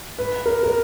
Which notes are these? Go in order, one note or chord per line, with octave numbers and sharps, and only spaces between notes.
B4
A#4
A#4